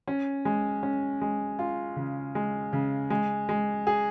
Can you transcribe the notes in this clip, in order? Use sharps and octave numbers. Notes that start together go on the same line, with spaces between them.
C#4
G#3
C#4
G#3
F4
C#3
G#3
C#3
G#3
G#3
G#4